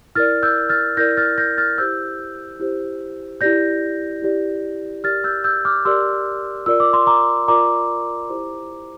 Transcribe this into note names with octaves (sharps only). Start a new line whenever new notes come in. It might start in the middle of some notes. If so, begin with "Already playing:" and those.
E4 A#4 D5 F6 A6
E6 G6
F6 A6
E4 A#4 D5 G6 A#6
F6 A6
G6 A#6
F6 A6
E4 G4 C5 E6 G6
E4 G4 C5
E4 G4 D5 G6 A#6
E4 G4 D5
G4 A#4 D5 F6 A6
E6 G6
E6 G6
D6 F6
G4 A#4 D5 C6 E6
F4 A#4 D5 E6
D6
C6
A#5 D6
F4 A#4 D5 A#5 D6
E4 G4 C5